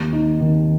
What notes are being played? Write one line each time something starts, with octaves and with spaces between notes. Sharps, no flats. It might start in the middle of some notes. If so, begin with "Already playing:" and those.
Already playing: D#2
D#4
D#3